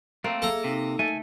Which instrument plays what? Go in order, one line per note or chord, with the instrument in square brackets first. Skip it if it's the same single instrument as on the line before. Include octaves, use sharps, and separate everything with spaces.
[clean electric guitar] A3 C4 [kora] A#3 [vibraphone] A#5
[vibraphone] G#4 E5 F5 [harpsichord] A4 A#5
[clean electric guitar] C3 [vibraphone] D#4
[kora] A3 [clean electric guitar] G#5